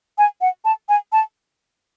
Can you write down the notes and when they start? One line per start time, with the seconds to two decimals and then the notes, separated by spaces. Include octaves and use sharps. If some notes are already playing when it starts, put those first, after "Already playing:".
0.18 G#5
0.41 F#5
0.65 A5
0.89 G#5
1.12 A5